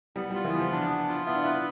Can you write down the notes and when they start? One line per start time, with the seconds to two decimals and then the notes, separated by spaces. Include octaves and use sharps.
0.16 G3 B3
0.31 G3
0.34 F4
0.44 E3
0.53 F3 B3
0.72 D4
0.89 B3
1.08 F4
1.27 B3 E4
1.35 D4
1.43 E4 B4